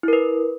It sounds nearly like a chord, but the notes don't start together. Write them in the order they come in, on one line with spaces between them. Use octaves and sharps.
E4 A#4 B4